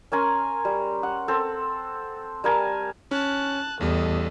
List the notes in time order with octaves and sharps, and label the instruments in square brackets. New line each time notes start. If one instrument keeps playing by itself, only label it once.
[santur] C#4 A#4 G#5 C6
G3
F#5
C4 A4
G3 A#4 G#5 A5
[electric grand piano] C#4 [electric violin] A5 F#6
[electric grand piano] A1 G3 [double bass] E2 [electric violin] A4 D#5